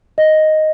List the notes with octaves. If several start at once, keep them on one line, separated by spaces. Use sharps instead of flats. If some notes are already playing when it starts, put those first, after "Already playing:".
D#5